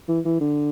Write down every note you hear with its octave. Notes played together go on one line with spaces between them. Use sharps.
E3
E3
D3